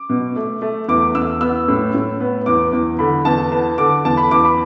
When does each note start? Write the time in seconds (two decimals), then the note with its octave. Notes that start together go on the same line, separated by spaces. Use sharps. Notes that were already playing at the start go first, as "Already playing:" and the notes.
Already playing: D6
0.10 B2
0.36 A3
0.62 A3
0.88 E2 D6
1.15 E2 E6
1.41 B3 E6
1.68 A2
1.95 A2
2.20 B3
2.46 E2 D6
2.73 E2
2.99 D3 B5
3.25 E2 A5
3.52 B3 A5
3.78 D3 D6
4.05 E2 A5
4.17 B5
4.31 E2 D6
4.45 B5